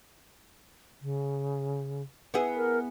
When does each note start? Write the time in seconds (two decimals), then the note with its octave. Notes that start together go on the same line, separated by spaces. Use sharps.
1.02 C#3
2.34 B3 E4 G#4
2.56 A#4